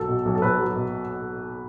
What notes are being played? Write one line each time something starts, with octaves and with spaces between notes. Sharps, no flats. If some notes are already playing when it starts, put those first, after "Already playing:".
Already playing: B1 F#3 A4
B2
B1
A4
B1 B4
F#3
B2